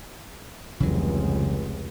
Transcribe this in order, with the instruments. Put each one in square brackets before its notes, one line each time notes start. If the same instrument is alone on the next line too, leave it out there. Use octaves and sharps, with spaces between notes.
[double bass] F1 C#2 [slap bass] C#3 E3 F#3